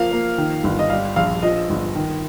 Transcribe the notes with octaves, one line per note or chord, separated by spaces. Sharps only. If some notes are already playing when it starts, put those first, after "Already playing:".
Already playing: F3 A#3 F5
A#3
D#3
G1
D#5
G3 F5
A#1 F5
F3 D#5
G1
D#3